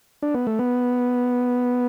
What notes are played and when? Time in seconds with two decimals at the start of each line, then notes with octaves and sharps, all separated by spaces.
0.22 D4
0.34 B3
0.47 A3
0.59 B3